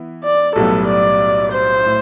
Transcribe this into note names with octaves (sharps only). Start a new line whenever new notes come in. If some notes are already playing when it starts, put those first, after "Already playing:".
Already playing: E3 B3 E4
D5
B1 A2 G3 B3 A4
D5
C5
A2